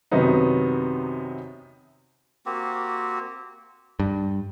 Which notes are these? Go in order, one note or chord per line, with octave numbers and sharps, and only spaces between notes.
F#2 C3 D#3 F#3 B3 D#4
A#3 C4 F#4 G4
G2